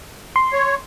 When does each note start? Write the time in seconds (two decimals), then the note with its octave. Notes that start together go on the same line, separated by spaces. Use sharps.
0.36 C6
0.53 C#5